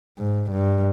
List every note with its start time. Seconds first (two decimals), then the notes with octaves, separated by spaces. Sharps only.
0.18 G#2
0.51 G2